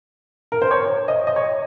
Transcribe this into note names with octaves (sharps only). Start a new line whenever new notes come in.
A#4
C5
C#5
D#5
D#5
C#5